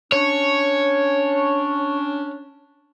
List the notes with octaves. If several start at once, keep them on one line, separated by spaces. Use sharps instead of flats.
C#4 D4 C#5